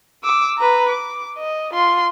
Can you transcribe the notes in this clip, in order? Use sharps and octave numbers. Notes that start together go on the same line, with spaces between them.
D6 E6
B4 A#5
D6
D#5
F4 C6